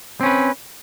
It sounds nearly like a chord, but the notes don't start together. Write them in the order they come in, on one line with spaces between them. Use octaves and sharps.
C4 C#4 B4